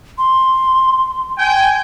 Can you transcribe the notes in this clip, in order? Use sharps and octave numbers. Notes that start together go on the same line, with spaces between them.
C6
G5 G#5